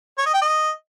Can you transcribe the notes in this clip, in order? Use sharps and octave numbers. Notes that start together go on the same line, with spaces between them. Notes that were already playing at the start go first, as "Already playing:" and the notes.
C#5
D#5
G5
D#5